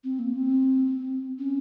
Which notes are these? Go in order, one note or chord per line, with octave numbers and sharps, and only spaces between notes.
C4
A#3
C4
C#4